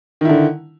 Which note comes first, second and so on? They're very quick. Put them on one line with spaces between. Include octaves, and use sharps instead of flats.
D#3 E4 D3